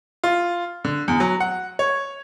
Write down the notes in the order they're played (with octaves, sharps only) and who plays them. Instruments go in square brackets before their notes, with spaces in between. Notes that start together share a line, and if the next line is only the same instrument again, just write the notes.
[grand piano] F4
D3
E2
F#3
F#5
C#5